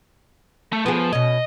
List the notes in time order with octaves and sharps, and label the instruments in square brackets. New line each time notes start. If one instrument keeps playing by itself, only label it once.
[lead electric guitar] A3
[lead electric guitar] F3 [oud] B3 G#4
[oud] B2 C#4 [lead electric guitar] D#5